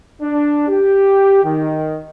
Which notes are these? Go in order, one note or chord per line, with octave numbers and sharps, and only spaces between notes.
D4
G4
D#3